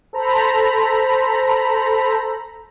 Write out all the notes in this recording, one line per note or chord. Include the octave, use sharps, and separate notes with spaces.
A4 C5 A#5 B5